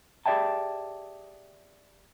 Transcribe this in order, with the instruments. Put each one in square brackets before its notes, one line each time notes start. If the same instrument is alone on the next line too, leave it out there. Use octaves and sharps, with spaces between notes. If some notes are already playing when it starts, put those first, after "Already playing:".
[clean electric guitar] G4 G#4 D5 E5 G5 A5